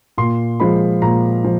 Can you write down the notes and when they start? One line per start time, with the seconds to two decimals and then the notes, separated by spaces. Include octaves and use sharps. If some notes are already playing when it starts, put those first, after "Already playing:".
0.18 A#2 C6
0.60 F3 G#3 B5
1.02 A#2 A#5
1.44 F3